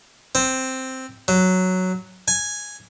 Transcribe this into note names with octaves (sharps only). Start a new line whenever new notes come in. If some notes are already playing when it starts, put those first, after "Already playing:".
C4
F#3
G#5